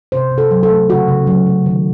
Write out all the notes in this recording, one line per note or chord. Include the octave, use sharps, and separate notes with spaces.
C3 C5
C3
A4
F#3
A4
A3
C#3 F#4
C#3
F#3
A3
D#3